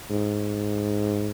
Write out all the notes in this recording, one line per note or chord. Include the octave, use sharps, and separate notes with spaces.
G#2